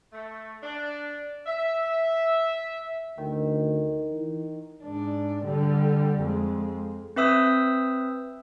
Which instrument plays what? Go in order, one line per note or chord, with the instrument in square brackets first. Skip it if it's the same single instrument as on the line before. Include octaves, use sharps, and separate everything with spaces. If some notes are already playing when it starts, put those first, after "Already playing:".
[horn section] A3
D4
E5
[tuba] D2 [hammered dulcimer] D#3
[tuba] E3
[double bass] G#2 D4
D3 G3
F2 G#3
[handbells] C4 B4 E5 D#6 E6 G6